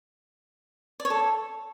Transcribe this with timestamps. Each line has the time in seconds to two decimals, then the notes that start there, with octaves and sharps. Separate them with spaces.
1.00 D5
1.05 C#5
1.10 A4